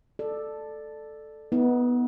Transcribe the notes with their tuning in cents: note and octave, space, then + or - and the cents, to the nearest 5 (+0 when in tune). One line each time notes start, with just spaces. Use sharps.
A4 +0 D5 +15
B3 -5 D#4 +45